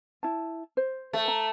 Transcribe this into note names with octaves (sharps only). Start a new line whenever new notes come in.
E4 A5
C5
A3 A4
A#5